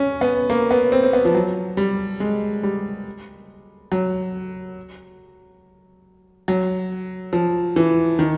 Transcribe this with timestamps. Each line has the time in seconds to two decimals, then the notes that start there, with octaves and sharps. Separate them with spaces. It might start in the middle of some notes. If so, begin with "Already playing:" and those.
Already playing: C#4
0.21 B3
0.50 A#3
0.71 B3
0.92 C4
1.03 C4
1.13 B3
1.25 F3
1.35 F#3
1.77 G3
2.20 G#3
2.63 G3
3.92 F#3
6.48 F#3
7.33 F3
7.76 E3
8.19 D#3